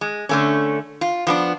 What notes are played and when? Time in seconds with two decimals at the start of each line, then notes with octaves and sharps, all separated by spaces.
0.01 G#3
0.29 D3 A3 C#4
1.01 F4
1.27 F3 B3 D4